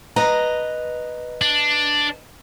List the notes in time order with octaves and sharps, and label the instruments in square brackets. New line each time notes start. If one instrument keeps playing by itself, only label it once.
[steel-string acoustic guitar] B4 D#5 A#5
[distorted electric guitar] D4